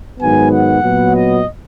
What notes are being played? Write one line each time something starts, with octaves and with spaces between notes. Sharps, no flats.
G#2 D#3 F#3 B3 G#5
F#5
A#2 F#3 B3
D#5